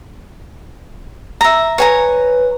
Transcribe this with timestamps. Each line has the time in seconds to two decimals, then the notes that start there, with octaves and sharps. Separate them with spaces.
1.41 E5 A#5
1.78 B4 C#5 G#5 A#5